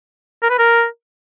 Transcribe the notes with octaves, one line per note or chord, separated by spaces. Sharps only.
A#4
B4
A#4